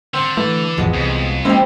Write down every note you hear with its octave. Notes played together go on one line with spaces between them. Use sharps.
D3 C4
E3 A3
A1 F2 F3 G#3 B3
C2 F2
G#3 A#3 C4 C#4 E4 G4